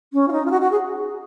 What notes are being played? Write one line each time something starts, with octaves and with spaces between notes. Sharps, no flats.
C#4
F4
D#4
F4
F#4
F#4
G#4